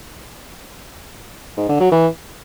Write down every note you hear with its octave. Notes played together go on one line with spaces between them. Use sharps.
G#2
D3
F#3
E3